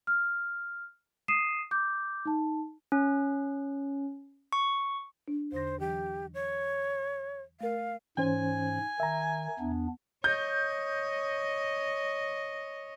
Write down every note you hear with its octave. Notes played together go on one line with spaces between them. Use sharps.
F6
D#6 C7 D#7 E7
D6 G6
D#4 A5
C#4
C#6
D4
E2 D3 C5 A#6
E3 F#3 G4
C#5
A3 A#4 F5
G#2 E3 C#4 C5 G#5
D#3 E5 A#5
E2 B3 D4
C#5 D#5 G6